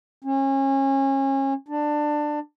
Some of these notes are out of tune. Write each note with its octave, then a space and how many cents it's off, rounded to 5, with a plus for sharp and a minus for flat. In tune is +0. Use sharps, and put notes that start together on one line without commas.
C#4 -30
D4 +15